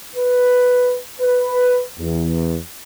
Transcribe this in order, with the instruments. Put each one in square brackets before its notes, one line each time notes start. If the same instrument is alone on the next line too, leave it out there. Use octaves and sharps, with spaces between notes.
[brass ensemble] B4
B4
E2